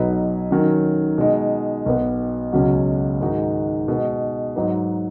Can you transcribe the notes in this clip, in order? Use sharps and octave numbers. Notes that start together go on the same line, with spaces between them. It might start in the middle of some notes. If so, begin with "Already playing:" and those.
Already playing: B1 B2 F#3 D#4 B4
D#3 F#3 C#4
B2 G#3 D#4
B1 B2 B3
C#2 B2 F#3 C#4 F#4
G#2 D#3 G#3 D#4 F#4
B2 G#3 B3
G#2 F#3 D#4 B4